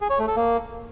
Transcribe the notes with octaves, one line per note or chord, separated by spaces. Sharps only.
G#4
C#5
A3
A4
A#3